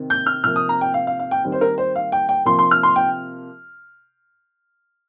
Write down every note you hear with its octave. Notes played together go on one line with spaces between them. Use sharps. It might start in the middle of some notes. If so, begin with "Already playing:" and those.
Already playing: C3 D#3 C4
G6
F6
C3 F3 A#3 F6
D#6
A#5
G5
F5
F5
F5
G5
D#3 G3 C4
C5
A#4
C5
F5
G5
G5
C3 F3 A#3 C6
C6
F6
C6
G5